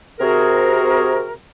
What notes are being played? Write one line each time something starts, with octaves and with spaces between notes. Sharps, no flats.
C3 F#4 G#4 A#4